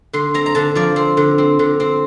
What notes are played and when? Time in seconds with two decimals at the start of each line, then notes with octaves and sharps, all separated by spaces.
0.13 D3 C6
0.34 C4 A#5
0.46 A#5
0.55 D3 A5
0.75 F3 D5
0.96 C4
1.17 D3
1.38 C4
1.59 D3
1.80 C4